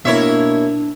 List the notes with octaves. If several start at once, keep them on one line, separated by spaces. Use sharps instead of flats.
B2 A#3 D4 E4 C#5 E5